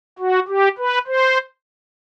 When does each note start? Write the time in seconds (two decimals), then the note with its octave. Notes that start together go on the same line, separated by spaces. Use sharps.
0.19 F#4
0.48 G4
0.78 B4
1.07 C5